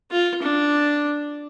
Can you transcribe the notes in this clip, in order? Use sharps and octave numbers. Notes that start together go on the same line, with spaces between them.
F4
D4